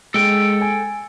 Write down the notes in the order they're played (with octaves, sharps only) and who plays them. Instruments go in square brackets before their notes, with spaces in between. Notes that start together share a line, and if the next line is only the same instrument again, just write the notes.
[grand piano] G#3 [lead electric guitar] A4 G5
[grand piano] G#5